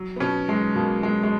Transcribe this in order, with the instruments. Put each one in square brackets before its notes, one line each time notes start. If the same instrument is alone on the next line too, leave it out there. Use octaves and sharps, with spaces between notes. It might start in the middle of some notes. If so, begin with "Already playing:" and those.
Already playing: [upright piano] F#3
B3
B2 C#4
F#3 G#3
B2 A#3
F#3 G#3
G#3